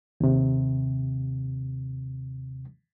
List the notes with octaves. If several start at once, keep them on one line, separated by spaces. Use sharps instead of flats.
D#2 C3